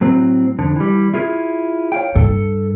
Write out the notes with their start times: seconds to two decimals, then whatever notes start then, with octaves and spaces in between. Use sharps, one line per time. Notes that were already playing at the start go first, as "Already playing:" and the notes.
0.01 A2 F#3 C4
0.59 F2 D3
0.76 E3 G3
1.14 E4 F4 G#4
1.92 C#5 F5 G5
2.15 G2 A4